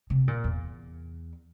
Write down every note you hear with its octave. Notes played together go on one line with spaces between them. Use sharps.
C3
A#2
E2